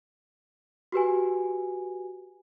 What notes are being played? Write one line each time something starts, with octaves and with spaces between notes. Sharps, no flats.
F#4 G4 B4 G#5